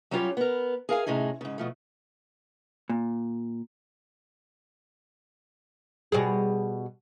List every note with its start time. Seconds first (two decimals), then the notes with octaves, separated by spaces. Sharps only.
0.11 F#3 G3 C#4 F4 G4 C#5
0.37 B3 A#4
0.89 G#4 A#4 F5 G#5
1.06 A2 C3 C#4 D#4 G#4
1.41 G#2 C#3
1.58 B2 F3 A3
2.89 A#2
6.12 B2 G3 G#4